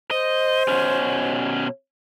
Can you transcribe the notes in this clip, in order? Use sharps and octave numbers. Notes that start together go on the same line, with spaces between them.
C5 D#5
B2 C#4